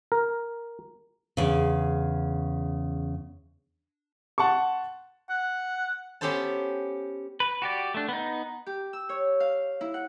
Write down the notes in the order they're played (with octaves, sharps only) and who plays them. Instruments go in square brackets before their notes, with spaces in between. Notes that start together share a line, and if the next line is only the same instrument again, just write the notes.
[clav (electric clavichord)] A#4
[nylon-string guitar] E2 C#3
[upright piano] F#5 A5 C6 C#6
[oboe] F#5
[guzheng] B3 C#4 G4 A4 C5 A5
[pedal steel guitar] B4
F#4 G4 D5
A3 D4
B3 D#4
[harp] G4
E6
C#5
F5
E4
F#5